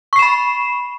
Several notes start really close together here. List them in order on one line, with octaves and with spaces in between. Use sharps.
C#6 C7 E7 B5